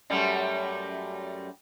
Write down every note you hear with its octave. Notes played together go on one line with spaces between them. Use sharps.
F#2 G3 A3